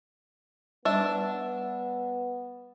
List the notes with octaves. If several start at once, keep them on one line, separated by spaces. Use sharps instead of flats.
G3 B3 D4 E5